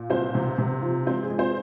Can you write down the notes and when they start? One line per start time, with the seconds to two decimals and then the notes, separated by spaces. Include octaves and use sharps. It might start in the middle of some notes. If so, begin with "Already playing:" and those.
Already playing: A#2
0.10 C2 C4 C5
0.35 C3
0.58 C3
0.82 F3
1.06 G#3 C4 C5
1.22 G#4
1.30 G#3
1.38 C4 C5